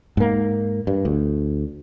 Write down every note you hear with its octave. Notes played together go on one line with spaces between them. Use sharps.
G#2 A#3
G2
D2